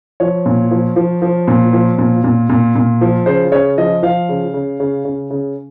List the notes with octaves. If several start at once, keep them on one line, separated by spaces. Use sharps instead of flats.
F3 C#5
A#2
F3
F3
F3
A#2
F3
A#2
A#2
A#2
A#2
F3
C#3 C5
C#3 C#5
F3 D#5
F3 F5
C#3
C#3
C#3
C#3
C#3